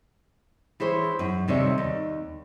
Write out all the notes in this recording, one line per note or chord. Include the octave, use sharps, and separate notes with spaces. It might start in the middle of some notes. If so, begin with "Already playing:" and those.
E3 E4 G#4 C5 C#5
F#2
D#2 C3 G3 C#5 E5
D#2